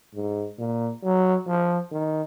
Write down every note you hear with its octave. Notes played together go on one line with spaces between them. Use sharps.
G#2
A#2
F#3
F3
D#3